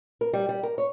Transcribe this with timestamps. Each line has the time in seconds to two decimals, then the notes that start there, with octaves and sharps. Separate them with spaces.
0.21 A#4
0.33 G3
0.49 G3
0.63 A#4
0.78 C#5